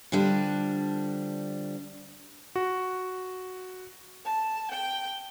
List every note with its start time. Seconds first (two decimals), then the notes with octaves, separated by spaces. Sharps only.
0.12 D3 F3 G3 D4
2.56 F#4
4.24 A5
4.71 G5